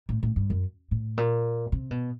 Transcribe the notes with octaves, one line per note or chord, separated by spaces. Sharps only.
A2
A2
G2
F#2
A2
A#2
C3
B2